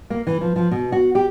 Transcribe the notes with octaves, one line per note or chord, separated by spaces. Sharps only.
A#3
E3
F3
F3
B2
F#4
G4